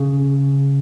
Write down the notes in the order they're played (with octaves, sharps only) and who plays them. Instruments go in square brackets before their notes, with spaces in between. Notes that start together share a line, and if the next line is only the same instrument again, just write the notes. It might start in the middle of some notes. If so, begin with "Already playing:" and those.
Already playing: [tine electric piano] C#3